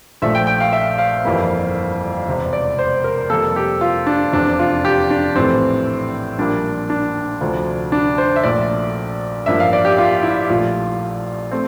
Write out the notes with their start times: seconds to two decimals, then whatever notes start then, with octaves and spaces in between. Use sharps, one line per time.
0.22 A#1 A#2 F3 A3 E5
0.35 G5
0.47 G5
0.60 F5
0.73 E5
0.99 F5
1.24 G1 F2 E3 G3 A#3
2.28 E1 E2 C3
2.53 D5
2.79 C5
3.04 A#4
3.30 F2 C3 G3 A#3 A4
3.56 G4
3.81 F4
4.07 D4
4.33 F1 E2 C3 D4
4.59 F4
4.85 G4
5.10 D4
5.35 A#1 A2 E3 A3 C4
6.38 A#1 A#2 G3 A#3 D4
6.90 D4
7.41 D2 C3 F3
7.92 D4
8.18 C5
8.36 E5
8.43 A#1 A#2 A3 D5
9.46 A1 G2 F3 A#3 E5
9.60 F5
9.73 D5
9.85 G4
9.98 F4
10.23 E4
10.50 A#1 A#2 A3 F4
11.51 A3 C4